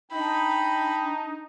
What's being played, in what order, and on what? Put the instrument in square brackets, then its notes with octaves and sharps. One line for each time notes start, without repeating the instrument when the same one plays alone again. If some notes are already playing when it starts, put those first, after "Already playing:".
[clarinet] D4 [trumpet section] D#4 [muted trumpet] G5 [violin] B5